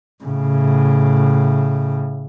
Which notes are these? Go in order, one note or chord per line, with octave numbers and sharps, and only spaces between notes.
A2 C#3